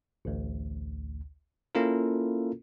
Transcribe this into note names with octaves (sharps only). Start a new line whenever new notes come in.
A1 D2
A#3 C#4 E4 F4 A4 A#4